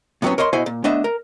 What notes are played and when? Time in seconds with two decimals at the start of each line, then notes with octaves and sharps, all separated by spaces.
0.22 A2 C3 F#3 G3 B3 C#4
0.38 A#4 C#5 D#5 C6
0.53 B2 E4 F#4 C5 D#5 G#5
0.66 A#2
0.84 A3 B3 D4 D#5 E5
1.04 A#4